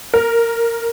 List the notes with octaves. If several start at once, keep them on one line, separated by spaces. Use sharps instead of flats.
A#4